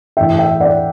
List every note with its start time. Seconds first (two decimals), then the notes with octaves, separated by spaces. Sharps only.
0.17 A2 E3 E5 G5
0.39 E5 G5
0.60 D5 F#5